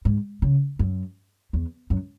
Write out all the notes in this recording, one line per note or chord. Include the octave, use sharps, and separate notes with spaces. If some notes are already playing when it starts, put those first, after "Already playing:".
G#2
C#3
F#2
E2
F#2